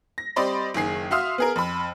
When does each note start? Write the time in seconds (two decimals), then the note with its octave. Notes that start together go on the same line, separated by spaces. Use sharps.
0.18 A#6
0.36 G3 C4 D5 D#5 B5 C6
0.74 F#1 D#3 G#4 C7
1.11 F#4 E5 F5 C6 D#6 F6
1.38 B3 G#4 A#4
1.56 F2 B5